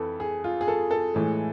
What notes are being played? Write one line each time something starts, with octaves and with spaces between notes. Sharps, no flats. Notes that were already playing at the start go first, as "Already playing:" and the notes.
Already playing: F2 E3 A4 B4
G#4
F4
G#4
A4
A4
A2 E3 G#3